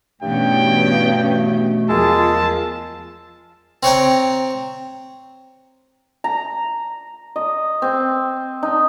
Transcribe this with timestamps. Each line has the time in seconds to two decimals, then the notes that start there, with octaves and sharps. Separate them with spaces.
0.22 G2 B2 E3 A3 B3 C#4 G5
1.89 E2 F3 G#3 F4 A#4 A5 E6
3.83 C4 C#5 G5 A#5
6.24 A#5
7.36 D#5
7.82 C4
8.63 D#4